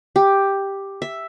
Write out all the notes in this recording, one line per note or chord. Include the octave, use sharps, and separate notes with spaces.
G4
E5